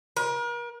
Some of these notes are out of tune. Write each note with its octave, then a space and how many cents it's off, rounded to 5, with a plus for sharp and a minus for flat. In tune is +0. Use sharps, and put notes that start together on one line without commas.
A#4 +40